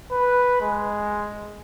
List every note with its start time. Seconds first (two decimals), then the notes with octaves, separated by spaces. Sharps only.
0.11 B4
0.61 G#3